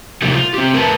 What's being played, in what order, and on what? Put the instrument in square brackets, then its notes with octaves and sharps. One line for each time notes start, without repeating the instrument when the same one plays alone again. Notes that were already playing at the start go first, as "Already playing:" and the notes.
[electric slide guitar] C3 F#3 A3 A#3 D#4 G4
F4
C4 G4
A3 A#4 B4 A5